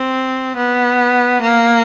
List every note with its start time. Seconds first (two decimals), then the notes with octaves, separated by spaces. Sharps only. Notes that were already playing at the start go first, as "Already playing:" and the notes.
Already playing: C4
0.57 B3
1.42 A#3